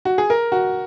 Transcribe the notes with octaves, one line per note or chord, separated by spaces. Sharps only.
F#4
G#4
A#4
F#4